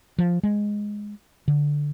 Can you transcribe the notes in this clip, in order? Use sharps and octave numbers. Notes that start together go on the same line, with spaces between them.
F3
G#3
D3